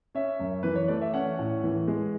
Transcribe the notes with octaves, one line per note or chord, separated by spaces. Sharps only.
C#4 E5
F#2
E3 B4
C#5
A3 D5
E5
C#4 F#5
A2
E3
G#3